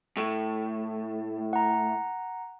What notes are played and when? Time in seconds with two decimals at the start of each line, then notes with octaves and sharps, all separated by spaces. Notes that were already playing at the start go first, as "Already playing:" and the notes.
0.17 A2 A3
1.53 F#5 A#5